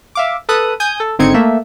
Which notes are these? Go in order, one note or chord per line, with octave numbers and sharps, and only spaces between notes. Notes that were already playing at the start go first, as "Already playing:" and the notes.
E5 F5 D6
A4 B4 D#6 F#6
G#5 D#6 G6
A4
G#1 D3 C4 D#4 G#6 C#7
A3 A#3 E5